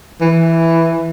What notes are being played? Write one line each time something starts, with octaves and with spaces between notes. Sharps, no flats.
E3